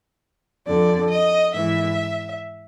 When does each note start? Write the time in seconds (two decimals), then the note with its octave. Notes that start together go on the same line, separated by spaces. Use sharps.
0.66 F2 D3 D5
1.10 D#5
1.53 G#2 E3 E5